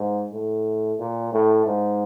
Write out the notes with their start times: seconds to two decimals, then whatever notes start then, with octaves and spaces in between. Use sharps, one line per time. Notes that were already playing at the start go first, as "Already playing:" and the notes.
Already playing: G#2
0.33 A2
0.99 A#2
1.33 A2
1.66 G#2